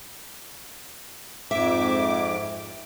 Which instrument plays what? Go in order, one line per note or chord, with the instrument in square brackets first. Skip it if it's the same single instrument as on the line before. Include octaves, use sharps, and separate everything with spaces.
[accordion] F2 G#2 D6 [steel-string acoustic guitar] E5